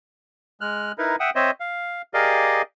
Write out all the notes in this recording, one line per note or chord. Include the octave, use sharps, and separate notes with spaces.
G#3 F6 F#6
D#4 E4 A#4 B4
E5 F#5 G5 D#6
C4 C5 C#5 D#5 E5
F5
G4 G#4 A#4 D5 D#5 F5